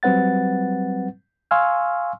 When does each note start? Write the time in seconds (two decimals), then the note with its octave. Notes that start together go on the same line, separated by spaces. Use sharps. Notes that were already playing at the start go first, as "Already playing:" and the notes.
0.03 F#3 G3 C4 B4 F#5 A6
1.51 F5 G#5 C6 C#6 E6 F6